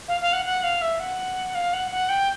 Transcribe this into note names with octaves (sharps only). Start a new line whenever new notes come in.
F5
F5
F#5
F#5
F5
E5
F#5
F5
F#5
F#5
G5